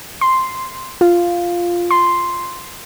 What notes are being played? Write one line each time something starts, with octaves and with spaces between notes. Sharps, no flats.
C6
F4
C6